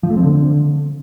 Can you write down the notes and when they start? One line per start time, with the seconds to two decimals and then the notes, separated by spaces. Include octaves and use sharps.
0.03 F3
0.10 A3
0.17 C4
0.24 D3